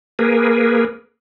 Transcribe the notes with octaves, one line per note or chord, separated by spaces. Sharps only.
A#3 G#4 A#4 B4